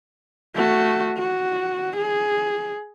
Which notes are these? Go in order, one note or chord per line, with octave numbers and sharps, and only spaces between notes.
A3 F#4
F#4
G#4